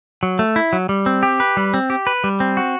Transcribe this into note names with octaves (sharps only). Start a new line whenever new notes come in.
F#3
A3
E4
F#3
G3
C4
G4
B4
G3
C4
G4
B4
G3
C4
F#4